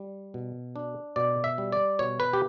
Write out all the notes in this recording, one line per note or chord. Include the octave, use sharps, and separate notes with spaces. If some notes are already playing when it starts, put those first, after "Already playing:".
Already playing: G3
B2
D4
B2 D5
E5
G3
D5
B2 C#5
B4
G4